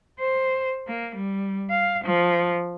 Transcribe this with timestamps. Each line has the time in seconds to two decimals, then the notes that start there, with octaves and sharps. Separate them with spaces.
0.20 C5
0.87 A#3
1.16 G3
1.70 F5
2.05 F3